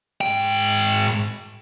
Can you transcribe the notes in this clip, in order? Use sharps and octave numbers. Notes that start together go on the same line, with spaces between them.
G#2 G5